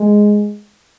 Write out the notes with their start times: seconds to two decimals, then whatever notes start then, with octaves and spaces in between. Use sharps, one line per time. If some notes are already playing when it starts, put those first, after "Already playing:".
Already playing: G#3